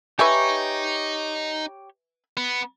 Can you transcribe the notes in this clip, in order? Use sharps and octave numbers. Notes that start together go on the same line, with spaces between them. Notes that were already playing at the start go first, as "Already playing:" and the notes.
D#4 G4 B4 C#5 E5 G#5 C#6
B3